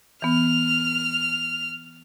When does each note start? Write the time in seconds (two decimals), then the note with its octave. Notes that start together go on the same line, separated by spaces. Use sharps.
0.22 E3 B3 F6